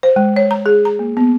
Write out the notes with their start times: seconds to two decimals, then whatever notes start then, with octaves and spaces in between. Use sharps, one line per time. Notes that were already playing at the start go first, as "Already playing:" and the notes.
0.03 C5
0.16 G#3
0.36 C#5
0.51 A#5
0.66 G#4
0.85 A#5
0.99 A#3
1.17 B3